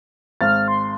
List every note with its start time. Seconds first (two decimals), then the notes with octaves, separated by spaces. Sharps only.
0.41 G#1 F6 A6
0.68 C6